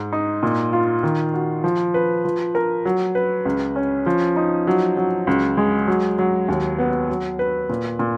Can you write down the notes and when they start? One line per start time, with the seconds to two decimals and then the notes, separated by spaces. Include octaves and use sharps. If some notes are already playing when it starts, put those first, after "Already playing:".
Already playing: G#2
0.13 D#4
0.43 A#2
0.73 F4
1.03 D#3
1.34 F#4
1.64 F3
1.94 B4
2.25 F3
2.55 A#4
2.85 F#3
3.15 B4
3.45 C#2
3.76 C#4
4.06 F3
4.36 D#4
4.67 F#3
4.97 F#3
5.27 C#2
5.57 G#3
5.88 F#3
6.19 F#3
6.48 D#2
6.79 B3
7.09 F#3
7.39 B4
7.70 A#2
7.99 A#2